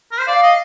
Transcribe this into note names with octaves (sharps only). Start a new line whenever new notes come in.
A#4
C5
D5 F5
D#5